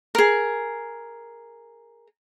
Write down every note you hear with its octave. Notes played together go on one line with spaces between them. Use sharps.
G#4 A#4